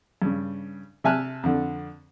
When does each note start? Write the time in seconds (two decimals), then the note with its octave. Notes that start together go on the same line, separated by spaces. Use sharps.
0.22 G2 C#3
1.04 C3 E5 G#5 A5 F6 F#6
1.43 F2 D3